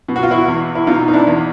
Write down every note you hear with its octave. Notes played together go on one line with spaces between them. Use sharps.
B2
F#4
F4
E4 F#4
E2
E4
B2 D#4 F4
D#4
D4 E4
E2